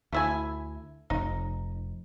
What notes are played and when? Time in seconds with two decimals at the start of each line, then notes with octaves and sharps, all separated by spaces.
0.12 D2 A3 E4 G#5
1.10 F1 D#4